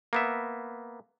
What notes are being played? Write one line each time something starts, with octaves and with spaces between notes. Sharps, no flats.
A#3 B3 E5